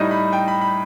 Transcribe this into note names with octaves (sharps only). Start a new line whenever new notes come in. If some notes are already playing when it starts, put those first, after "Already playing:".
Already playing: A2 G3 D#4 D#5
B5
G5
B5
B5